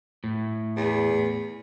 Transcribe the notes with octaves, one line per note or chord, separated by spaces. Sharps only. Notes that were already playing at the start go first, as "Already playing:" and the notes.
A2
E2